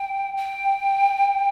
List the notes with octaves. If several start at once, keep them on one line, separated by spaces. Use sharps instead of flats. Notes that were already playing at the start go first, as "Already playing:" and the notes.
Already playing: G5
G5